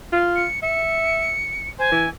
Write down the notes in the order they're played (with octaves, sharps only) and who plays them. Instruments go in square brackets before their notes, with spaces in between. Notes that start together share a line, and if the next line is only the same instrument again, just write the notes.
[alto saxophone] F4
[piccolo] C#7
[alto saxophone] E5 [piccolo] C#7
[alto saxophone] C5 [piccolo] G#5
[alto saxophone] E3